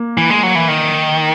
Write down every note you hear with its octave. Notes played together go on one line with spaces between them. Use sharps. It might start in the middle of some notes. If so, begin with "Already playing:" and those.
Already playing: A#3
E3
G#3
F#3
E3
D#3